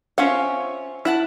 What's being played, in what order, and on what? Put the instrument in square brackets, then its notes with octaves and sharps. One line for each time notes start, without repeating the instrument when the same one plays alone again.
[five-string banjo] C4 C#4 F#5 [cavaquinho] F4 C#5 E5
[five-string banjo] E4 [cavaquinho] E5 F#5 A5